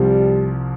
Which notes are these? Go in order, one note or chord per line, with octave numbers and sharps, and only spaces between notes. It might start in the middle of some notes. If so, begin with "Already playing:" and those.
Already playing: C2 C3 F3 G3 C4